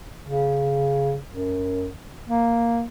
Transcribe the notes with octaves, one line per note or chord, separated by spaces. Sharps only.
C#3
F#2
A#3